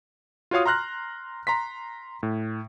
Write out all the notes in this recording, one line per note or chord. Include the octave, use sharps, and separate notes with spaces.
F4 F#4 C#5 F5 D#6
A#5 C6 F6 F#6 A#6
A#5 C6 B6
A2